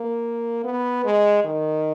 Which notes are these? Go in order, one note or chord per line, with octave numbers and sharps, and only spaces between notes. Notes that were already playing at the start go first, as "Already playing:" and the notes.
Already playing: A#3
B3
G#3
D#3